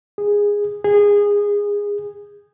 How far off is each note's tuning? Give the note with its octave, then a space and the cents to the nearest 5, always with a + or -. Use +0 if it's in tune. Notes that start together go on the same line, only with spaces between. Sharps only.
G#4 -15
G#4 -20